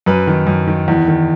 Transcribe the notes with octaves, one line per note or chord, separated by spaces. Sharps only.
F#2 B4
D#3
F#2
D#3
E2
D#3